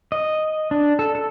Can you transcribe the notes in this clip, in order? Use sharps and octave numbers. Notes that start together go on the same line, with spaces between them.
D#5
D4
A4
A4